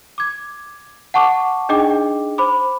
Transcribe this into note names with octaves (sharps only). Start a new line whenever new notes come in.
D6 G#6
F#5 A5 C#6 D6
D4 D#4 G#4 D#5 G5 D6
C5 B5 D6